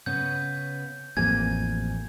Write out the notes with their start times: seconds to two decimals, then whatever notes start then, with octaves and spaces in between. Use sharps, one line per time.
0.06 C#3 B3 C#4 G6
1.17 A1 F2 A#3 G#5 G#6